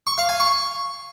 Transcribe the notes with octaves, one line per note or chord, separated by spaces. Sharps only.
C#6
F5
G#5
C#6